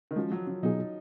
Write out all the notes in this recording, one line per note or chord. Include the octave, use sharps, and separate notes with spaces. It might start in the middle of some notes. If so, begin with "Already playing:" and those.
D#3
F3 G#3 C#4 F#4
F#3
F#3
B2 F#3 B3 D#4 F4 G#4